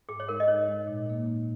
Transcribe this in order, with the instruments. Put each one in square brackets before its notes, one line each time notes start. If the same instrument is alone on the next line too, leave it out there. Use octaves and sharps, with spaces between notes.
[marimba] G#2 [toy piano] G#4
[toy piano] C#5
[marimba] G#3 D#4 [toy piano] A#4
[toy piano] D#5
[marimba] G#2 [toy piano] C#5
[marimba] G#3 D#4
A#2
A#3 D#4
A#2